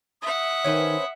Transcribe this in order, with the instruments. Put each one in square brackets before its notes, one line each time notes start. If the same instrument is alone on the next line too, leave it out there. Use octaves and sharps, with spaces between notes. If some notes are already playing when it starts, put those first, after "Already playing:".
[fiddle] E5 F#5 [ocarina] D#6
[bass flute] D#3 [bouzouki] C#4 B4 C5